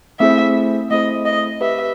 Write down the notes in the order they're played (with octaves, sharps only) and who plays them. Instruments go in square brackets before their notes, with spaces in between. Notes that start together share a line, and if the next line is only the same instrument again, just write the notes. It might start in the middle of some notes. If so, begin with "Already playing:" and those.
[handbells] A3 C4 E4 G#4 C5 [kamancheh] E5
[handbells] A3 C4 E4 G#4 C5 [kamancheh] D#5
[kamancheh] D#5
[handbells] G4 B4 D#5 [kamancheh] E5